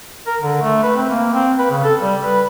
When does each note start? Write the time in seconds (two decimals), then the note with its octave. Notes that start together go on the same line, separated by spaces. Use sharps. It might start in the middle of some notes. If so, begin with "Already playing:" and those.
0.26 A#4
0.42 D3
0.61 A3
0.83 B4
0.96 C4
1.10 A#3
1.34 C4
1.58 B4
1.71 C#3
1.84 A4
2.01 G3
2.23 B4